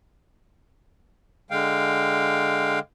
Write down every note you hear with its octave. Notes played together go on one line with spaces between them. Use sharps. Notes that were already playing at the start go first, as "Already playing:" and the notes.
D3 G#3 F5 G5